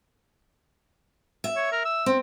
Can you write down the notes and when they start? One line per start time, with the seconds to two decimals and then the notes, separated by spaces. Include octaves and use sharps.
1.44 E5
1.56 C#5
1.72 A#4
1.85 E6
2.06 C4